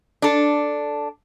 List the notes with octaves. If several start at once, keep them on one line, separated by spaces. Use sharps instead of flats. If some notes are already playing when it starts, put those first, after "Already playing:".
D4 A4